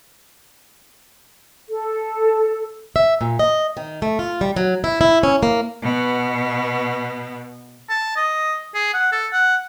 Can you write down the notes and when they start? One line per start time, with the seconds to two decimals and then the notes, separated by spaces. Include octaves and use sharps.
1.69 A4
2.96 E5
3.21 A#2
3.39 D#5
3.77 D#3
4.02 A3
4.19 F4
4.41 G3
4.56 F#3
4.84 E4
5.01 E4
5.23 C#4
5.43 A#3
5.80 B2 B3
7.89 A5
8.17 D#5
8.75 G#4
8.94 F#5
9.12 A4
9.33 F#5